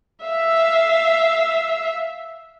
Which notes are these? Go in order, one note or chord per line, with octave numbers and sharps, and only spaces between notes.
E5 F5